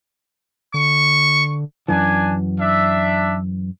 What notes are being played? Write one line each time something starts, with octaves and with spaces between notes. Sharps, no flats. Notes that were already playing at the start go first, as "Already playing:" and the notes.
D3 C#6
F#2 E3 D4 G#5
D4 E5